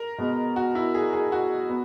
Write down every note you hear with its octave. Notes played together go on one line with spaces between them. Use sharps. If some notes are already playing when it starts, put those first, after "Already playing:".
Already playing: A#4
B2 G#3 B3
F#4
E4
G#4
G#4
F#4
B3